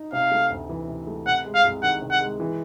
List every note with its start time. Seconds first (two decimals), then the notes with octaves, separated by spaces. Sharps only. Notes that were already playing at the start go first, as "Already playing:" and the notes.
Already playing: D#4
0.12 C3 F5
0.31 A3
0.50 D2
0.69 E3
0.88 C3
1.07 A3
1.26 C3 F#5
1.44 G#3
1.54 F5
1.64 C2
1.83 D#3 F#5
2.01 C3
2.11 F#5
2.21 G#3
2.40 E3